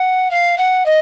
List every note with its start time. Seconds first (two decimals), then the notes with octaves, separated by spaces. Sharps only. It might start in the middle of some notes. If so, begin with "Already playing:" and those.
Already playing: F#5
0.31 F5
0.58 F#5
0.86 D#5